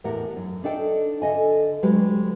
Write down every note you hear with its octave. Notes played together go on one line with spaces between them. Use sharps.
E2 A2 G4 A#4 F#5
F#2
D4 D#4 A4 G5
D3 A4 D#5 G#5
D2 F#3 G#3 G4 B4